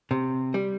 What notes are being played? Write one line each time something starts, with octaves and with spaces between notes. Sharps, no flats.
C3
G3